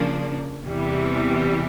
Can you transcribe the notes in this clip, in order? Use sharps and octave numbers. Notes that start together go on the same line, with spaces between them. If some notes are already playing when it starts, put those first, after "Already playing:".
Already playing: C#3 F3 A#3 D4
E2 C3 E3 G3